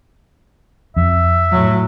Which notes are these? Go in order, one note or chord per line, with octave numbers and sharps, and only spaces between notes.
F2 E5
A2 F#3